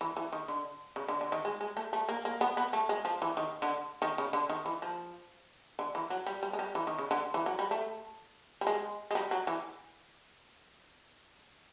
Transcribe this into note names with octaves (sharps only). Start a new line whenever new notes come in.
E3
E3
D#3
D3
C#3
D3
D3
D#3
G#3
G#3
A3
A3
A#3
A#3
B3
B3
A3
G#3
F3
E3
D#3
D3
D#3
C#3
D3
D#3
E3
F3
D3
E3
F#3
G3
G3
G#3
G3
E3
D#3
C#3
D3
E3
F#3
G3
A3
G3
G#3
G#3
G3
F#3
E3